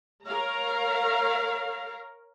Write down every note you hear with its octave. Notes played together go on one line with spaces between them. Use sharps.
A#4 C#5 F5 A#5